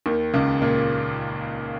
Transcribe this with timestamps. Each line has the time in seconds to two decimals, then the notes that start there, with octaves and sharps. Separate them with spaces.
0.06 D#2 D#3
0.33 C#2 C#3
0.62 A#2